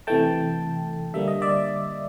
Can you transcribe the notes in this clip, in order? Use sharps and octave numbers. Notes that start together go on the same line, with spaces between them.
C3 E3 A3 G5 A5
D3 G3 A#3 E5
D#5
D5 E5